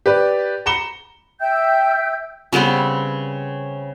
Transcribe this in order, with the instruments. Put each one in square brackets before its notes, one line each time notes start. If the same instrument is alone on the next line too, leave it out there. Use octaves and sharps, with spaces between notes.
[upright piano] G4 B4 D5
A#5 B5 C#7 E7 G7
[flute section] E5 G5 E6 G6
[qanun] C#3 G3 B3 C4